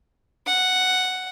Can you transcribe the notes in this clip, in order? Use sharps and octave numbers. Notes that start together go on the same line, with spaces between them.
F#5